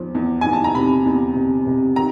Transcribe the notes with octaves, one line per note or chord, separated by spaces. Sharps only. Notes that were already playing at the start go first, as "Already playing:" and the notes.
Already playing: E2 F3
E2
E2 G#5
A5
A#5
C3 B5
E2
C3
C3
D#3 A#5